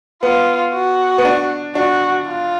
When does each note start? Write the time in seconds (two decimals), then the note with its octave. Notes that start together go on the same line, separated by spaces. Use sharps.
0.22 B3 F4
0.73 F#4
1.18 B3
1.25 D4
1.75 D4 F#4
2.27 F4